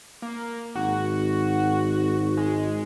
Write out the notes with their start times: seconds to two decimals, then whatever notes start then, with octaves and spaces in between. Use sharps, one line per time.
0.22 A#3
0.75 G#1 F#4
2.37 G#3